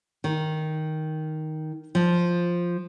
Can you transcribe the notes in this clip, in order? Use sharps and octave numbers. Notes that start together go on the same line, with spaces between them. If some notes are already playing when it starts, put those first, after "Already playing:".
D#3
F3